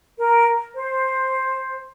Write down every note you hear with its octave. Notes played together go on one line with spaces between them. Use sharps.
A#4
C5